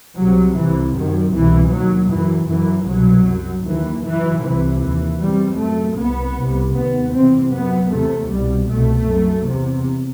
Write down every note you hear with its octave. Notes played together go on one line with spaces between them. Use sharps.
C2 C3 F#3
C2 C3 E3
F#2 D#3
C2 B2 E3
D#2 F#3
F#2 E3
F#2 E3
C2 B2 F#3
F#2
D#2 E3
F#2 E3
C2 C3 E3
D#2 E3
E2 C3 G3
F#2 A3
C2 C3 B3
C2 C3
D#2 B3
E2 C3 C4
F#2 B3
E2 C3 A3
C2 B2 G3
C2 B2 A3
F#2
E2 C3